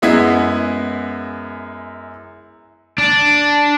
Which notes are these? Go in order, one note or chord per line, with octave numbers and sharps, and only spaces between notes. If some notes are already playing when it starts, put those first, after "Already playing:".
F#2 G#3 B3 E4 G#6 B6
D4